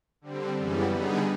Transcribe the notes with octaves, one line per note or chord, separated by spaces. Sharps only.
D3 G3 C4
F#2 C#3 E3 G3 B3
D3 G3 B3 D#4 G#4